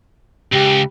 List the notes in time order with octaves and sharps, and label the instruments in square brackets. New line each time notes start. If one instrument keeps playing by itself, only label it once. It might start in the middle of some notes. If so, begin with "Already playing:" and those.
[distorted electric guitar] C#2 [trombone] G4